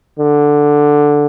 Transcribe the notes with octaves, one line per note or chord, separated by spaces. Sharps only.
D3